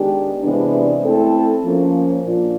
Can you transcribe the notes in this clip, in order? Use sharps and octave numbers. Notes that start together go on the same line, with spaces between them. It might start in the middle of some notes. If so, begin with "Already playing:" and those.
Already playing: D#3 G#3 B3 D4 G4
C3 E3 G#3 B3 D4
A3 C4 E4 A4
F3 A#3 C#4
A#2 F3 A#3 D4 F4